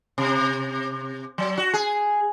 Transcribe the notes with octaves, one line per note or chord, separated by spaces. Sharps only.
C3
F#3
F#4
G#4